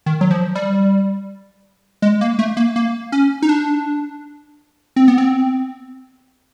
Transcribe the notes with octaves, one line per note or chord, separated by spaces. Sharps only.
D#3
F#3
F3
G3
G#3
A#3
A3
A#3
A#3
C#4
D#4
D4
C4
B3
C4